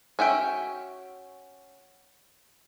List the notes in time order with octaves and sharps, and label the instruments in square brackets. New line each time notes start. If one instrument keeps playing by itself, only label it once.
[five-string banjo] C#4 F#4 E5 G5